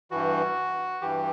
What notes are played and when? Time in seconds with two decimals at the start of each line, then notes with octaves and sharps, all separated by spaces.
0.11 G2 E3 F#4
1.01 G2 E3 G4